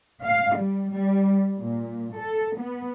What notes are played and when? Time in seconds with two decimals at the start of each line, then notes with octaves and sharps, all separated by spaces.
0.25 F5
0.57 G3
0.91 G3
1.60 A#2
2.16 A4
2.58 B3